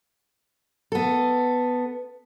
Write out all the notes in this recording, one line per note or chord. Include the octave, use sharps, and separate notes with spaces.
B3 A4